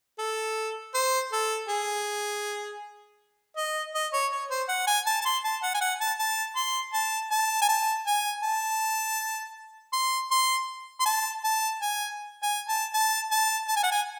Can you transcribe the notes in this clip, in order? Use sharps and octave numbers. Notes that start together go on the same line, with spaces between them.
A4
C5
A4
G#4
D#5
D#5
C#5
C#5
C5
F#5
G#5
A5
A5
C6
A5
F#5
G#5
F#5
A5
A5
C6
A5
A5
G#5
A5
G#5
A5
C6
C6
C6
A5
A5
G#5
G#5
A5
A5
A5
A5
G#5
F#5
G#5